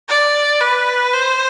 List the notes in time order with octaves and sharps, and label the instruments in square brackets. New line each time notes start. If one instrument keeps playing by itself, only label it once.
[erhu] D5
B4
C5